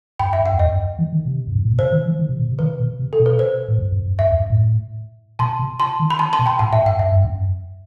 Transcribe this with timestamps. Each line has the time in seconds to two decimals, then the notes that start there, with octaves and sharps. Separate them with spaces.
0.19 F#2 G5 B5
0.33 E5 G5
0.39 F#2
0.46 F#5
0.52 E2
0.59 D#5
0.66 F#2
0.99 E3
1.13 D#3
1.25 C3
1.47 F#2
1.56 G2
1.63 A2
1.71 B2
1.79 C3 C5
1.92 D#3
2.06 E3
2.19 D#3
2.29 C3
2.39 B2
2.49 C3
2.59 D#3 B4
2.80 B2
2.99 C3
3.13 A4
3.20 B2
3.26 B4
3.39 C5
3.68 A2
3.79 G2
3.92 F#2
4.06 F#2
4.19 F#2 E5
4.30 E2
4.40 F#2
4.50 A2
5.39 B2 A5 C6
5.59 C3
5.80 A5 C6
6.00 D#3
6.10 B5
6.19 A5 C6
6.33 A5 C6
6.39 B2
6.46 G5 B5
6.59 A2 F#5 A5
6.73 A2 E5 G5
6.86 G2 F#5
6.99 F#2 E5
7.12 G2
7.25 F#2